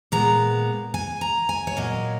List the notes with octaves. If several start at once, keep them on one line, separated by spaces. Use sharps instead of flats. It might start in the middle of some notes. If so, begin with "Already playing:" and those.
A#2 G#3 B3 A#5
G#5
A#5
G#5
C#5
A#2 F#3 A#3 D#5